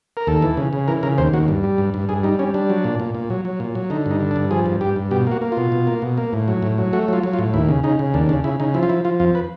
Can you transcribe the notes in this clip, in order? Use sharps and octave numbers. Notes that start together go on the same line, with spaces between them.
A#4
D#2 A4
E3
C#3
C#3
E3 A#4
C#3 A#4
D#2 C5
D#2 F#4
G2
G3
G2
G2
G2 G#4
G3 D#4
G3 C#4
G3 D4
F#3
A#2
A#2
A#2
F#3
F#3
A#2
F#3
D3 D#4
G2 D#4
D3
D4
G2
F3 G#4
G2
G2 G4
G2
B2 G4
A#3 F#4
A#3
B2 F4
B2
A#3
B2
A#3
A2
F#3
A2
F#3
A3 F#4
F#3 F4
F#3
F4
A2
D#2 E4
C#3
C#3 D#4
C#3
D#2 D4
C#3 D4
C#3 E4
C#3 D#4
F3 E4
F4
F3 E4
F3 F4
F2 F4
B4